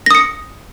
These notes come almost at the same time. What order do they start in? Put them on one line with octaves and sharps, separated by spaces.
A#6 D#6 C#7